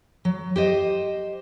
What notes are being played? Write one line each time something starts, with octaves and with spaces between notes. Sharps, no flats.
F#3
G4 C5 D#5